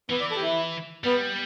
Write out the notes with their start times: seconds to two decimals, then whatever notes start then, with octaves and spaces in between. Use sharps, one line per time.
0.10 E3 B3
0.20 D5
0.31 A4
0.36 G4
0.42 E4
1.04 G3 B3